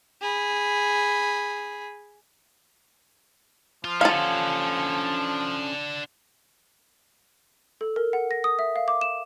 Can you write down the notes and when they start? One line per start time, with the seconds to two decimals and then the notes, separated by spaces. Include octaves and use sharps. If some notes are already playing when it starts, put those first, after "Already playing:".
0.22 G#4 B5
3.85 F3 F4
4.01 C#4 D4 F4 A4 F5 F#5
7.81 A4
7.96 A#4
8.13 F#5
8.31 A#6
8.44 D#6
8.59 E5
8.76 F5
8.88 D6
9.01 E7